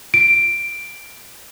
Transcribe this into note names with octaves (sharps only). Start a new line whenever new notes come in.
D7